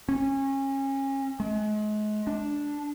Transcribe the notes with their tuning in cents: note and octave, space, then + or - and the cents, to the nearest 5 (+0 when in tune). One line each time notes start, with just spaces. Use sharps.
C#4 -30
G#3 +35
D4 -5